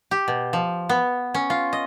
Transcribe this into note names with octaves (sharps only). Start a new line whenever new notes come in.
G4
B2
F3
B3
C#4
F4
D#5